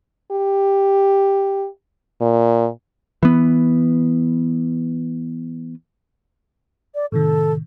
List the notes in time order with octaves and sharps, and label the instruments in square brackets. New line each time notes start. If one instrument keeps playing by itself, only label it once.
[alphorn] G4
A#2
[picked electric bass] E3 B3
[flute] D5
[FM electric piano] A2 C3 D#3 [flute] A4